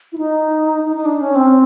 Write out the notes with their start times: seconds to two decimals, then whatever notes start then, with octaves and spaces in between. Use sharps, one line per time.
0.12 E4
0.18 D#4
0.85 D#4
0.96 D#4
1.05 D4
1.21 C#4
1.35 C4